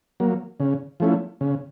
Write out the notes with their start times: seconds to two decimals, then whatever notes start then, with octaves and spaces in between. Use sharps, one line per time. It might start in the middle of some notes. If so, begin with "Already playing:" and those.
0.20 F#3 A#3
0.60 C#3
1.00 F3 A3 C#4 E4
1.41 C#3